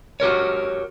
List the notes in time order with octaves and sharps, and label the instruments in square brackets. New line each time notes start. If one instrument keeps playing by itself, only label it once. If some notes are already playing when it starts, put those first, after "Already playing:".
[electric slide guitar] F#4 G4 A#4 C#5